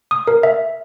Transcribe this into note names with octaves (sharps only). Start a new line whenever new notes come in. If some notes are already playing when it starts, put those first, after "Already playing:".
D#6
A#4
E5